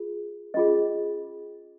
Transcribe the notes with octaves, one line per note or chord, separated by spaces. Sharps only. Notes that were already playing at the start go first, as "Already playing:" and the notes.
Already playing: F4 G#4
C#4 F4 G#4 D#5